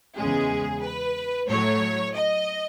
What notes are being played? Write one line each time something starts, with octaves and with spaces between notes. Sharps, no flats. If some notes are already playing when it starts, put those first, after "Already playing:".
E2 C#3 G#3 G#4
B4
A2 F#3 A3 C#5
D#5